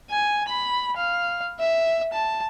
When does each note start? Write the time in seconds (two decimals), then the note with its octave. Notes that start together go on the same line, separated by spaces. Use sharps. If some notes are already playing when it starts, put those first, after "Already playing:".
0.10 G#5
0.48 B5
0.96 F5
1.59 E5
2.13 A5